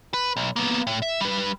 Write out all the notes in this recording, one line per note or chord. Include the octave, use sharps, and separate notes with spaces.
B4
B1
A#3 B3
A2
E5
G3 B4